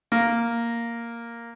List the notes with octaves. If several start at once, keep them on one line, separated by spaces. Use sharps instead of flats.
A#3